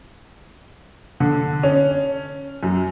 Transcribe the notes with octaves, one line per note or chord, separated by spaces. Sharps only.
D3
C#4
F#2